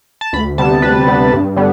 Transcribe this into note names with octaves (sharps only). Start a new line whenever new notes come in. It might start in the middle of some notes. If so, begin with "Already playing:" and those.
A5
D2 B5
C3 G3 B3 A5
D2 B4
C3 G3 B3
G2
D3 G3 B3